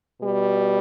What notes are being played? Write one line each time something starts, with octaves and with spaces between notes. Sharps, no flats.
B2 G3